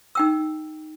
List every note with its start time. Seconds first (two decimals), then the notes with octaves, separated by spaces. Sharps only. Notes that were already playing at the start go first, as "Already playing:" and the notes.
0.15 D#4 G5 E6